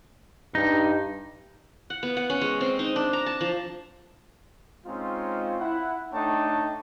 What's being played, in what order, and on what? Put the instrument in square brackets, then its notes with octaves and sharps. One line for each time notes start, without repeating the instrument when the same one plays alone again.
[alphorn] G2 [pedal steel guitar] D#4
[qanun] F#5
B3
F#5
C#4
G#3
C4
D#4
D4
A#5
A5
F3
[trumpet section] G#3 C4 C#4 D#4 F4
E4 F#5
A3 D4 D#4 C#5 G5 A5